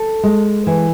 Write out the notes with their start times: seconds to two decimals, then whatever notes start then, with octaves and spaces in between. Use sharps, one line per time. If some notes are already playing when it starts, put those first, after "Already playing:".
Already playing: A4
0.23 G#3
0.67 E3